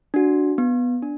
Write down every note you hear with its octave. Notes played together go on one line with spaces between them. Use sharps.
D4 F#4
B3
D4